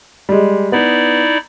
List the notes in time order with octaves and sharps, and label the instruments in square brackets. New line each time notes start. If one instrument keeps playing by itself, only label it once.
[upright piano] G3 G#3
[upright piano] B3 [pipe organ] D#4 E4 D5